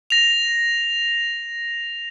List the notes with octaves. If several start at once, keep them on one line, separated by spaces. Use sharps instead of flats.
A#6 F7